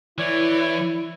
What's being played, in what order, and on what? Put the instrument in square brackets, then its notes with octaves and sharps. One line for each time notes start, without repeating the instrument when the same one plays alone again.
[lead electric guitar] E3 [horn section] E4 [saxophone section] C#5 D5